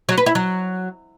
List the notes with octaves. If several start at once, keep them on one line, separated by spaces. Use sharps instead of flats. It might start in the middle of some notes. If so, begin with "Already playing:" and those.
F#3
B4
E4
F#3